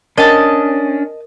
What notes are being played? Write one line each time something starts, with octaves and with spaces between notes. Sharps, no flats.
C#4 D4 A#4 D#5 A5